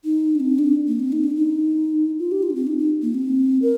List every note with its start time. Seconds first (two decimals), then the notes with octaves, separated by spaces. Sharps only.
0.05 D#4
0.35 D4
0.40 C4
0.59 D4
0.88 A#3
1.00 C4
1.12 D#4
1.24 D4
1.36 D#4
2.19 F4
2.32 G4
2.43 F4
2.50 D4
2.55 C4
2.67 D#4
2.78 D#4
3.02 A#3
3.15 C4
3.62 A#4